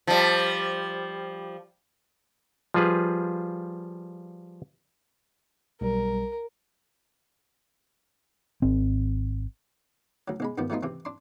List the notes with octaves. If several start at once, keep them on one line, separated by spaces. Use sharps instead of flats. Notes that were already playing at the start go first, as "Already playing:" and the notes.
F3 G3
F3 G3 F4 G#4 B4
B1 G3 A#4
G#1 C4
D2 F#3
B1 G#3 B5
G2 D#3 F3 B3
F3 A3 B3 D#4 F4
C3 E3 C4
D4 C6